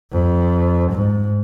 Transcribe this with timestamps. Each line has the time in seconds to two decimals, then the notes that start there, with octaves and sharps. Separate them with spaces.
0.12 F2
0.92 G#2